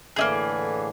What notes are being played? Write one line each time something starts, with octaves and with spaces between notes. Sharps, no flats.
A2 D3 E3 A#3 D#4 G#4